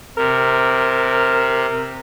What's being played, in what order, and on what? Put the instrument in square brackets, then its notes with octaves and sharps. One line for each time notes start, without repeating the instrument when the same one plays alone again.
[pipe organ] C3 [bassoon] A#4